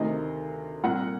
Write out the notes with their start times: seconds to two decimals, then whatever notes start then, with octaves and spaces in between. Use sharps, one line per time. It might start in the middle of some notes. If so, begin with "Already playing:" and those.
Already playing: D2 C3 D#3 D#5
0.84 C2 A#2 F#5